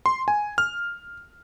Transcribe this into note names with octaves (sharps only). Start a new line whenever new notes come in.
C6
G#5
F6